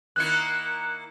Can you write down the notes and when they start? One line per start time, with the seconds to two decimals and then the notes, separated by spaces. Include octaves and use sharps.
0.16 D#3 A#3 E4 F#6 C#7